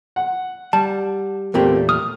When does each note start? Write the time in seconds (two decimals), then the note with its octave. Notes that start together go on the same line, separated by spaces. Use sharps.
0.16 F#5
0.73 G3 A5
1.54 E2 A#2 A3 A#3 C4 G4
1.89 D#6 F6